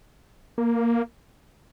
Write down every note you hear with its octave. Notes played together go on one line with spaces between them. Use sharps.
A#3